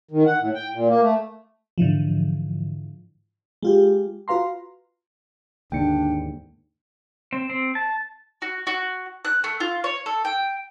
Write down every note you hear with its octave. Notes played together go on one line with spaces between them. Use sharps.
D#3
F#5
A2
G5
A#2
A#3
A3
G#2 D3 E3 F3
G#3 F4 G4
F4 F#4 B4 F5 A#5 C6
D#2 G#2 D3 D4 G5 C#7
C4
C4
A5
F#4
F#4
F#6
A3
F4
C#5
A4
G5